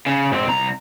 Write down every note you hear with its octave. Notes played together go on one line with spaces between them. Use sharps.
C#3
G#2 C4
C2 A#5